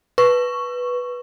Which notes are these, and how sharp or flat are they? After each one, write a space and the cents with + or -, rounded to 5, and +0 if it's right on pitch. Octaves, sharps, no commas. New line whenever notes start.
B4 -5 C#6 +0